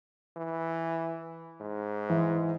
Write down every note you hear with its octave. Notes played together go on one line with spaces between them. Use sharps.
E3
G#2
E3